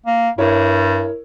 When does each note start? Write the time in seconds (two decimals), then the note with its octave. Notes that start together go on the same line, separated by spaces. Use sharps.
0.06 A#3
0.38 G2 E4 A#4 C#5